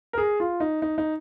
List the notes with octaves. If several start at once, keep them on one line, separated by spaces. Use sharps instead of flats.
A#4
G#4
F4
D#4
D#4
D#4